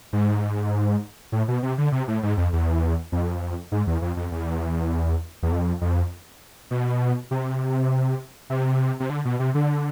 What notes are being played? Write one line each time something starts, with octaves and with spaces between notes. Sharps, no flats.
G#2
A2
B2
C3
D3
C3
A2
G#2
F2
E2
F2
G#2
E2
F2
F2
E2
E2
F2
F2
B2
C3
C3
C3
D3
B2
C3
D3